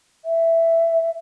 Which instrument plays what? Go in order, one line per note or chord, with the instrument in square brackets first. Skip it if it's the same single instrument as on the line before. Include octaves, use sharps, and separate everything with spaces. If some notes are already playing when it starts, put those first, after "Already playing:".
[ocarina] E5